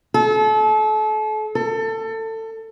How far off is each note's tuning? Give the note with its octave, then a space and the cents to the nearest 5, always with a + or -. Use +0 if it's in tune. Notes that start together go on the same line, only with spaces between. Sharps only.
A4 -35
A4 +25